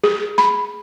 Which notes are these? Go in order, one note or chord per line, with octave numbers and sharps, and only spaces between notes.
G#4
B5